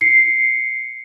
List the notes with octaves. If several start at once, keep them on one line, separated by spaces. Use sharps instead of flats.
C7 C#7